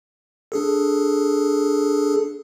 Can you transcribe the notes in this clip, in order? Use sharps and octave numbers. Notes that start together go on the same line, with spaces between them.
D4 G#4 A4